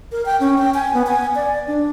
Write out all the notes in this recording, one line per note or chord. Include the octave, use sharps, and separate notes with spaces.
A#4
G5
C#4
G5
G#5
B3
G#5
D5
D4